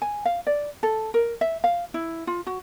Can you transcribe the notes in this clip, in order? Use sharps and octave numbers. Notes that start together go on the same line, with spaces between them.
G#5
F5
D5
A4
A#4
E5
F5
E4
F4
F#4